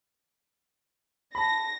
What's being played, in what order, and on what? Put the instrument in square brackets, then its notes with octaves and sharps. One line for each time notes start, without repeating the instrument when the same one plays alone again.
[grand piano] A5 B5 [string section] A#6